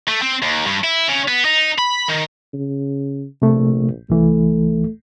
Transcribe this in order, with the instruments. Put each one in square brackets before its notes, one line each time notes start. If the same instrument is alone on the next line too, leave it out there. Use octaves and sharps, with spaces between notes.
[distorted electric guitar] A3
C4
D#2
G2
E4
C#3
B3
D#4
B5
D#3
[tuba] C#3
[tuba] A#1 [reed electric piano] C3 A3
[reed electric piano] C2 E3 [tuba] A3